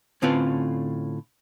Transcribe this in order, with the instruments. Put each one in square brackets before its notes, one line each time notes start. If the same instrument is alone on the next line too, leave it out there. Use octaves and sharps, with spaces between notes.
[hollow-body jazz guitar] A2 D3 C4 C#4 F4 B4